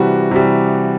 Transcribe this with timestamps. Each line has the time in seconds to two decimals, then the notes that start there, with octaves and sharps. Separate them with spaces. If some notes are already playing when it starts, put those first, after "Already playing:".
Already playing: C3 E3 G3 F#4
0.31 C3 E3 G3